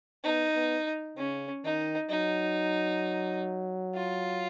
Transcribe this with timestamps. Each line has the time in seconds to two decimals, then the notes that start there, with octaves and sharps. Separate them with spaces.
0.24 B3 D#4
0.55 B3
1.17 C#3 C#4
1.64 D#3 D#4
2.10 F#3 D#4
3.95 F4